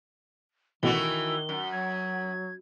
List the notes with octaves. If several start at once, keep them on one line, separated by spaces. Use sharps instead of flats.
A1 B2 D#3 E3 A3 F#4 G7
F#2
F#3 G#6